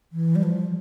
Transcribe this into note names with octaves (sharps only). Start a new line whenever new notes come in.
E3
G3
F3